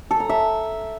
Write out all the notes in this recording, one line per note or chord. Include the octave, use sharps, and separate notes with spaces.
A4
A#5
E5